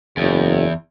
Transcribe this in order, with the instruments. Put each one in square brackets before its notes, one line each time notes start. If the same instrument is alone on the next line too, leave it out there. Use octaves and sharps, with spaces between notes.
[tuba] F#1 [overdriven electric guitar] E2